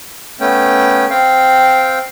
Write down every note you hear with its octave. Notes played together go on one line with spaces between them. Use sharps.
A3 B3 C#4 G5
C4 F5 G5